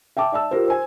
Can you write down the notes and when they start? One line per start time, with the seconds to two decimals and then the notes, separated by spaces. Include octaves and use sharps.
0.17 E5 G5 A5 D6
0.32 D5 E5 A5 E6
0.51 F4 G4 A#4 C5
0.68 C5 G#5